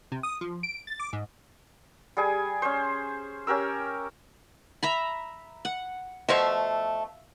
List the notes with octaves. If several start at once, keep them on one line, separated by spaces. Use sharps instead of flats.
C3
D#6
F3
D7
A6
D6
G#2
G3 G#4 G#5
C#4 C5
C#4 G4 A#4 E6
E5 A#5 B5
F#5
B2 F3 A3 E5 F5 C#6